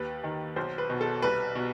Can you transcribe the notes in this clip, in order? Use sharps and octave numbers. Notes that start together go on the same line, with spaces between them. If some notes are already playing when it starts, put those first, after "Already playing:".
Already playing: D#2 B4
D#3
B1 C5
B4
B2
A4
C2 B4
B2